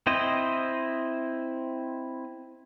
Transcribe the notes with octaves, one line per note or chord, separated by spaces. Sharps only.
C4 E4 C5 D#5